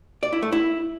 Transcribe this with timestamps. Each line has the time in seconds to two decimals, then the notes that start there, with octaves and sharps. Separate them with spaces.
0.23 D5
0.33 E4
0.42 A3
0.52 E4